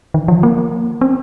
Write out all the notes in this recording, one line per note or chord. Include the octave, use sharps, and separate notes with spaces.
D#3
F3
A#3
C4